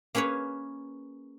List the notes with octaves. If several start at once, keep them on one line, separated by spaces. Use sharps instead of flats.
A#3 C#4 G#4 B4 C#5